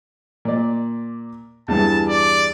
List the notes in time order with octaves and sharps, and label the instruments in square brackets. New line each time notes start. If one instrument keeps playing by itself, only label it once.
[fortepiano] A#2 D5
[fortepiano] E2 G2 E3 [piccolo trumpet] A5
[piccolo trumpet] D5